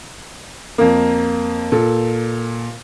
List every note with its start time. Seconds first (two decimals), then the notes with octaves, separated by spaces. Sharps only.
0.78 F2 A#3
1.72 A#2 A4